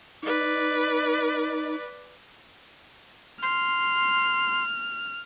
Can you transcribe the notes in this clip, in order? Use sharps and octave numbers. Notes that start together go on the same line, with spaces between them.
D#4 B4 D5
C6 F6